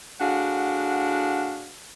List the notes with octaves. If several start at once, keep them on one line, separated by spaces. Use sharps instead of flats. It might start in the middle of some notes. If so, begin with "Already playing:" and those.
A2 D4 F#4 G#4 F5 F#5